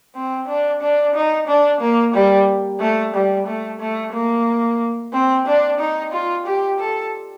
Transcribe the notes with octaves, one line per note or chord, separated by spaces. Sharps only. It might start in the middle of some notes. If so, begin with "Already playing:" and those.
C4
D4
D4
D#4
D4
A#3
G3
A3
G3
A3
A3
A#3
C4
D4
D#4
F4
G4
A4